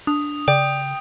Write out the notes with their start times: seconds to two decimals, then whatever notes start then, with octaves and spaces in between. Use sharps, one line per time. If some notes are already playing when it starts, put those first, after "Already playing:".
0.07 D4 D#6
0.48 C#3 D5 G5